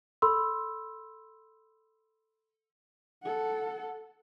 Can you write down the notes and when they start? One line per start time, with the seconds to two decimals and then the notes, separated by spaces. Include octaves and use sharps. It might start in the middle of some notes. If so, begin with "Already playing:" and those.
0.22 A4 B5 C6 E6
3.23 A4 F#5